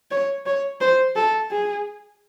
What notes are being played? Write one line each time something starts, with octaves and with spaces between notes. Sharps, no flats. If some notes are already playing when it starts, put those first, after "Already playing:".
C#5
C#5
C5
A4
G#4